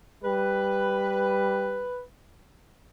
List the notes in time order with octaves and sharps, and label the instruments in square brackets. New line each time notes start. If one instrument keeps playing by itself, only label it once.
[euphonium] G3 [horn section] B4